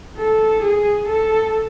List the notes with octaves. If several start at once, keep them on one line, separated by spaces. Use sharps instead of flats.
A4
G#4
A4